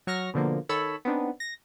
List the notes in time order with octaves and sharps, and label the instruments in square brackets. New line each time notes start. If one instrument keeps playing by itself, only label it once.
[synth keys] F#3 C#6 F6 A#6
B2 D3 F3 A#3
D#3 A4 C#5 B5 E6
B3 C4 D4 D#4
A#6